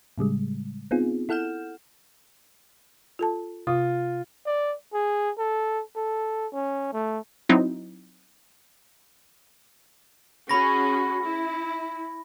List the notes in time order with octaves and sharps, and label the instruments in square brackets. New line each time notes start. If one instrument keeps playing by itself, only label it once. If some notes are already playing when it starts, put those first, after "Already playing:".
[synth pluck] A2 C#3 G3 G#3
B3 C4 D#4 F4 G#4
E4 A4 F#5 F6 G6 E7
[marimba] F4 A4 A5
[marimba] C3 D#6 [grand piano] F4
[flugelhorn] D5
G#4
A4
A4
C#4
A3
[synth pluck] F#3 C4 D#4 E4
[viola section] C#4 F#4 G#4 [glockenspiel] B5 A#6
[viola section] E4